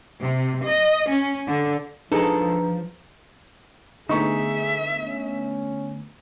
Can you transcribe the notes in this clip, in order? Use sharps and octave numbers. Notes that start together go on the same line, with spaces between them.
C3
D#5
C#4
D3
F3 G#3 D4 D#4 G#4 A4 B4 A#5
D3 A3 B3 D#4 G#4 E5 C#6
C#4